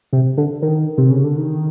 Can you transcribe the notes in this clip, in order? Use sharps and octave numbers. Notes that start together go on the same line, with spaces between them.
C3
D3
D#3
C3
C#3
D3
D#3